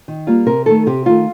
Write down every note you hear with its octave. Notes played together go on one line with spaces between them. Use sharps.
D#3
G3 A#3 F4
C3 A#4
D#3 A3 A4
C3 G4
D#3 A3 F4